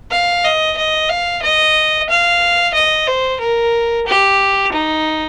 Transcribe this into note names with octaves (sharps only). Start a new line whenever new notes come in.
F5
D#5
D#5
F5
D#5
F5
D#5
C5
A#4
G4
D#4